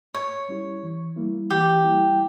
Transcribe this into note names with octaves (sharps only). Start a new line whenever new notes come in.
G#2 C#5
G3 C#4 E4 G4
E3
G3 A#3 E4
E3 G4
G3 A#3 E4